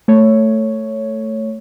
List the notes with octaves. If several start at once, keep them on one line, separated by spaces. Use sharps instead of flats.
A3 C#5